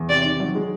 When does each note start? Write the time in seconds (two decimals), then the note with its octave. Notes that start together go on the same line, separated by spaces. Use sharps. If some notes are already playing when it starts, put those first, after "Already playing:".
Already playing: E2
0.09 C3 D5
0.24 D#3
0.40 F#3
0.55 G#3